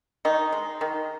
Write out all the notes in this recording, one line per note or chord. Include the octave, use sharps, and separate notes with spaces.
D#3 D#4
G#3
D#3